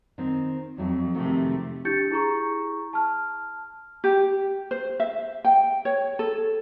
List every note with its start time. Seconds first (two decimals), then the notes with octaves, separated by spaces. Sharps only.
0.18 D#3 C4
0.78 F2 F#3 A3
1.15 C3 D#3 A3 F#4
1.85 D4 E4 G4 G6 A6 C#7
2.11 E4 G#4 A#5 C#6
2.93 A5 F6
4.04 G4
4.71 C5
5.00 E5
5.45 G5
5.85 C#5
6.19 A4